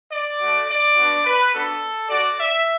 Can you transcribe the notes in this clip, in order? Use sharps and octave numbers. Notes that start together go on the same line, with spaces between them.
D5
A3 F#4
D5
B3 D4 F#4
B4
B3 D4 F#4 A4
A3 F#4 D5
E5